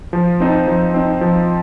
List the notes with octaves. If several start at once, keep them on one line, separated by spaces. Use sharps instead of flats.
F3
C4 D#4
F3
C4 D#4
F3